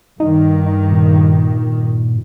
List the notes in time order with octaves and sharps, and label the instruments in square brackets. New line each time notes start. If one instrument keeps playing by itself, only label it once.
[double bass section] G2 D#3 [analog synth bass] D#4
[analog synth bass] A#2